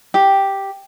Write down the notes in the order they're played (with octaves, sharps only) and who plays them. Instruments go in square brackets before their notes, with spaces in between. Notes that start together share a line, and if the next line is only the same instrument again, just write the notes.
[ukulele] G4